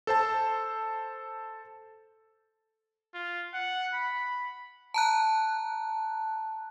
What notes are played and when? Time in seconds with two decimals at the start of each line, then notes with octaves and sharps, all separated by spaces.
0.07 A4 C5 A5
3.14 F4
3.54 F#5
3.94 B5
4.94 A5 A#5 F#6